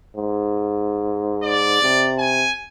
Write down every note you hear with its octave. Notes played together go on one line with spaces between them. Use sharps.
G#2
D5
C3
G#5